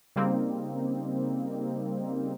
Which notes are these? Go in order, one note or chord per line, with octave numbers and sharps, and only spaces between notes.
C#3 G3 A#3 C4 D#4